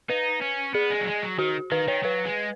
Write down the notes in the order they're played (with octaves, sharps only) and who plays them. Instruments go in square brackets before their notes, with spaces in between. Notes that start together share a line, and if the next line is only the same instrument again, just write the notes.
[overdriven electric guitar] D#4 [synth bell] B4
[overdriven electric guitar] C#4
[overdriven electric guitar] B3 [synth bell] G#4
[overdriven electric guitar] G#3
F#3
G#3
F#3
[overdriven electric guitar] D#3 [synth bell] F#4
[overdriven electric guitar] D#3 [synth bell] B4
[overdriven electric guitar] D#3 [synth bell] C#5
[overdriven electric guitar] F#3 [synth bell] B4
[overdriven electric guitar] G#3